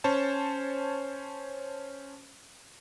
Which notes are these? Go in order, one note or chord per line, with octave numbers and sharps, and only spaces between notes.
C#4 C5 C#5 A5